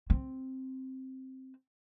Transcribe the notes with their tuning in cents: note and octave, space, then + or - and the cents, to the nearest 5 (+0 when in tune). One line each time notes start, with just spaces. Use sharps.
C4 +5